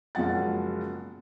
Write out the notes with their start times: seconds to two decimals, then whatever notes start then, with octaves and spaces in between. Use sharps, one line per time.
0.15 F#1 C#2 B2 F3 F#5 A6